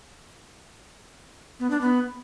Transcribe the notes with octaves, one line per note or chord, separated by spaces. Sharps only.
B3
D4
B3